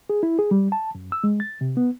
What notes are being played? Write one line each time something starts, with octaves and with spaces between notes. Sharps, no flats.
G#4
E4
G#4
G3
A5
F#2
E6
G#3
A6
C3
B3